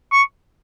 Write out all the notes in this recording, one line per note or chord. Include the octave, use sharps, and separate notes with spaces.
C#6